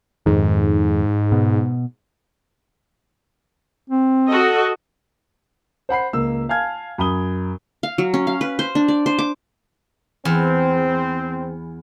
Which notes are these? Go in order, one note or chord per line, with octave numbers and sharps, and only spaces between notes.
F2 G#2 D#3
B2
C4
F#4 A4 D#5
C5 F#5 B5 C7
C#2 A#3 E6
F5 G#5 A5 F6 G#6
F#2 B5 D#6 G7
F5
F#3
C#4
F5
B4
C5
D4
D5
C5
D6
E2 C4